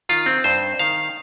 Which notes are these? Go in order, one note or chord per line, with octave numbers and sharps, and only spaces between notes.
D#3 F4
C4
G2 C5
D#3 F5